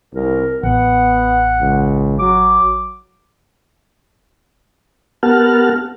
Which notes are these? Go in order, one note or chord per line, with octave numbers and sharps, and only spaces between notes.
C2 A#4
A1 B3 F#5
C#2
F#3 D6
B3 G4 A#4 F#5 A5 F6